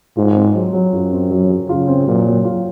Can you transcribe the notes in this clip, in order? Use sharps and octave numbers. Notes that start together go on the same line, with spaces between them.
G#2 F4
C4
F#3
F#3
F#2 F4
C4
F#3
F#3
C#3 F4
C4
A#2 F#3
F#3
F4